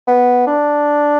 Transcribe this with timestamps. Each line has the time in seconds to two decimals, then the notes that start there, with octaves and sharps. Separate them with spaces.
0.08 B3
0.47 D4